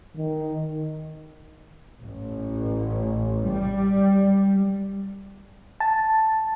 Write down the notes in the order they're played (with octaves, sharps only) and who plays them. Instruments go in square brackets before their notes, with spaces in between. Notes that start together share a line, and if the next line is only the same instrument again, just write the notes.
[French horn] D#3
[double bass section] A1
G3
[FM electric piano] A5